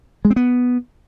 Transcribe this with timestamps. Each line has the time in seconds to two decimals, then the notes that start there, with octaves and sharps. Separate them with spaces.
0.25 G#3
0.30 C4
0.36 B3